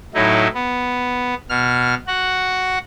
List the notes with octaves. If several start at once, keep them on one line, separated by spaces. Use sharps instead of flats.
A2 F#3 D#4 E4
B3
B2 F6
F#4 F#5